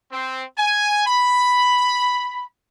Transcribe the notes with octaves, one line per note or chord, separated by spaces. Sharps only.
C4
G#5
B5